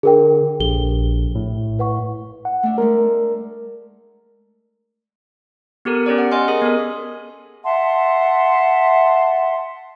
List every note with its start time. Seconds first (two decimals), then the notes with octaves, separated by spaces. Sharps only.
0.03 D3 G#4 A#4 G5
0.60 A#1 G4 A4 G7
1.35 A2
1.79 B4 F#5 C#6
2.45 F#5
2.63 A3 D4
2.78 G#3 A3 A#4
5.85 B3 G4 A4 A#4
6.06 C#4 G4 C#5 D5
6.18 F#5
6.31 D#5 G#5 C6 F6
6.48 G#4 A#4 D#6
6.62 B3 A4
7.63 E5 F#5 A5 C6